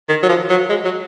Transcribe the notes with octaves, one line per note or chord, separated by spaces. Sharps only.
D#3
F#3
F3
F#3
G#3
F#3